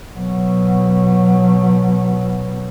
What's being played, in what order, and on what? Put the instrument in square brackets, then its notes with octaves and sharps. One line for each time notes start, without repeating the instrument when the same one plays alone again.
[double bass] B2 F#3